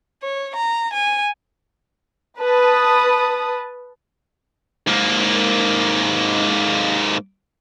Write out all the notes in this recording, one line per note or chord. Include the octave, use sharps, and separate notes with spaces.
C#5
A#5
G#5
B4 A5 D#6
G#2 A#3